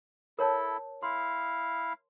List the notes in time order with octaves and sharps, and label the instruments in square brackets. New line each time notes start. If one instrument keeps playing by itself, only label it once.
[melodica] E4 A4 [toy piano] A#4 C#5 A5
[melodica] E4 F5 [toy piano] C6